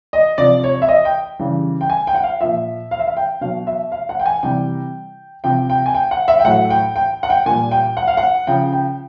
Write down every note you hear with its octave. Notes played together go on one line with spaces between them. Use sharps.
D#5
C3 F3 D5
C#5
E5
D#5
G5
C#3 E3 G3
G5
G#5
G5
F#5
F5
A#2 F3 E5
F5
E5
F5
G5
B2 F#3 F5
E5
F5
F#5
G5
G#5
C3 E3 G3 G5
C3 F3 G5
G5
G#5
G5
F#5
E5
G5
A2 F#3 F#5
G5
G5
F#5
G5
A#2 G3 G#5
G5
F#5
F5
F#5
C#3 F3 G5
G5